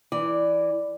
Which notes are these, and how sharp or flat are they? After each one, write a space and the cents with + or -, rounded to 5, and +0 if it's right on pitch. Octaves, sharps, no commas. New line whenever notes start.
E3 +5 D5 +0